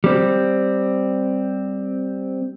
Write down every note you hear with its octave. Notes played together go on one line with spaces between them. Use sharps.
G3 C4